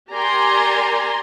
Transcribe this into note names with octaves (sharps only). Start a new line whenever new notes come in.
G4 A#4 D5 G#5 A#5 C6